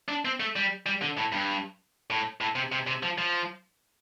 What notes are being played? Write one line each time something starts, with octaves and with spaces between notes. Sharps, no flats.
D4
C4
A3
G3
G3
D3
A2
G2
A2
A2
C3
C3
C3
F3
F3